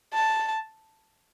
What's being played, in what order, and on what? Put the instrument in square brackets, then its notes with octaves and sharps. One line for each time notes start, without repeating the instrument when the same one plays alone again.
[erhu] A5